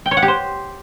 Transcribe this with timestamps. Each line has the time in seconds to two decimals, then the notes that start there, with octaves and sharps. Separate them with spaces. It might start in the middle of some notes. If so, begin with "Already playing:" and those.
0.06 G5
0.11 C#5
0.17 F#5
0.22 G4
0.28 C5